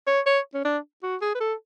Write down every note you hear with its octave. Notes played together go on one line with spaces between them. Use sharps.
C#5
C#5
C#4
D4
F#4
G#4
B4
A4